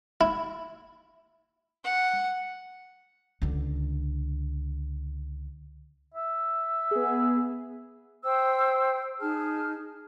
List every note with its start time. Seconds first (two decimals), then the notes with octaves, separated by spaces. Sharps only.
0.21 E4
1.84 F#5
3.42 C#2 D3
6.14 E5
6.91 B3 G#4
8.25 C5 G5 E6
9.20 D#4 G#4 A5 F6